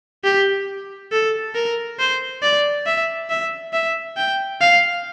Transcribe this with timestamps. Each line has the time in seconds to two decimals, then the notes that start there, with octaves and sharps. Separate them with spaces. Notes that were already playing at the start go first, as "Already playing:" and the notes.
0.24 G4
1.12 A4
1.55 A#4
1.99 C5
2.43 D5
2.87 E5
3.30 E5
3.73 E5
4.17 G5
4.61 F5